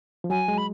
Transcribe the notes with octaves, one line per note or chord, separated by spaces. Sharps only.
F3
F#3 G#5
G#3
B5